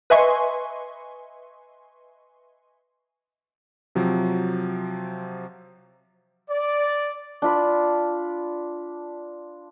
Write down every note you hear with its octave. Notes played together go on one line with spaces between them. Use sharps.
B4 D#5 E5 G#5 C6 C#6
C3 F3 F#3
D5
D4 F4 B5